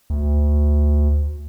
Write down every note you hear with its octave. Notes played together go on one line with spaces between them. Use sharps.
D2